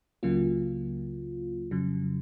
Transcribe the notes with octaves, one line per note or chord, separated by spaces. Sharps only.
C#2 C#3 F#3 A#3 F4
F2 C#3 F#3